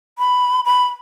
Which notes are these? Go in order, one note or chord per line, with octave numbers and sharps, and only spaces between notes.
B5
B5